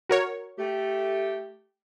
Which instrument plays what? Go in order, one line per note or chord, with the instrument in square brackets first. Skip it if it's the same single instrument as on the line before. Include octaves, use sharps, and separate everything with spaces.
[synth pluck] F#4 A#4 C#5
[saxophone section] A3 G4